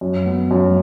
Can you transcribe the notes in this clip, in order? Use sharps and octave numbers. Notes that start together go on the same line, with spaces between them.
F#2
B3
F#2